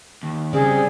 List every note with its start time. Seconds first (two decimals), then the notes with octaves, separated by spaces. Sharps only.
0.23 D#2
0.53 C#3 G3 C4 G#4 D5